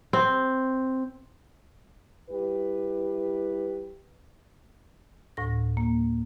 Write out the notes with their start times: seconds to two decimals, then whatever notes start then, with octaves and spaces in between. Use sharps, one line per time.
0.13 C4
2.30 G3 E4 G4 B4
5.37 D2 A2 A#6
5.77 A#3